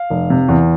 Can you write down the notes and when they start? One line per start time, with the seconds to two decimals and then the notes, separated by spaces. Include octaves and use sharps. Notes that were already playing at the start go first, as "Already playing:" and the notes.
Already playing: F5
0.10 F1
0.30 C3
0.48 E2